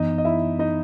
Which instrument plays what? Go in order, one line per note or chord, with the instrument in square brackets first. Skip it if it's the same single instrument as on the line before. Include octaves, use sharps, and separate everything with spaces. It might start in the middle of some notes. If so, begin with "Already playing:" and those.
Already playing: [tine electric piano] F#2 E3 B3 [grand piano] D#4 D#5
[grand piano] D#5
E4 E5
D#4 D#5